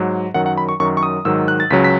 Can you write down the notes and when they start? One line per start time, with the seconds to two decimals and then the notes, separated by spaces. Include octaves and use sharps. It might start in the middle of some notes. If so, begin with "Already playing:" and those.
Already playing: G#2 F#3
0.34 F#2 D#3 F#3 F#5
0.46 F#5
0.58 B5
0.69 C#6
0.80 F#2 D#3 F#3 C#6
0.97 C#6
1.03 D#6
1.25 G#2 D#3 F#3 E6
1.48 F#6
1.60 A6
1.70 C#2 C#3 F#3 B6
1.84 B6